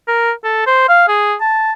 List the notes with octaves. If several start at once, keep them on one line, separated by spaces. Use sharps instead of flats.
A#4
A4
C5
F5
G#4
A5